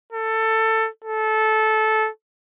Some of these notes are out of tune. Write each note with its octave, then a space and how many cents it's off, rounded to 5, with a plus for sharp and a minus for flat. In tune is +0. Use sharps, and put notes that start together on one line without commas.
A4 +15
A4 -15